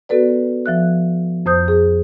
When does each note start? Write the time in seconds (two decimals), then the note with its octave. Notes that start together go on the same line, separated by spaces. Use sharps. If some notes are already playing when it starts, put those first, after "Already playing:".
0.09 B3 F#4 A4 B4 D5
0.66 F3 E5 F#6
1.46 F2 C5 D#6 G6
1.68 G#4